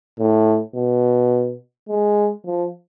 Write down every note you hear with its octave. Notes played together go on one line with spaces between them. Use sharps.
A2
B2
G#3
F3